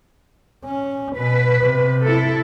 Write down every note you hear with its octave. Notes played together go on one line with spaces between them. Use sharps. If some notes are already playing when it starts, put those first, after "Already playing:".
C#4
B2 B4
C3
E4 A4